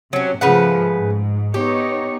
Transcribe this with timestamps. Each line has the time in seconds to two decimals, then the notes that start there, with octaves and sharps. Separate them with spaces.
0.13 C3 F#3 C#4
0.41 G#2 C#3 F3 A3 B4 F#5
0.98 G#2
1.54 B3 D#4 G4 C#5